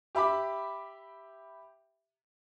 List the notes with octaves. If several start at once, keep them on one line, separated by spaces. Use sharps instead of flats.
G4 E5 B5 D6